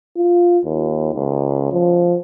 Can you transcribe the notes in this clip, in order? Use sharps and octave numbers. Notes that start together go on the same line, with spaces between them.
F4
D#2
C#2
F3